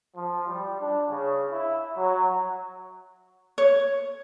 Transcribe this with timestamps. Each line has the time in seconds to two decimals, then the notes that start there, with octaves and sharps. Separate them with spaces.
0.16 F3
0.47 G3
0.80 D4
1.09 C#3
1.52 E4
1.97 F#3
3.58 C#5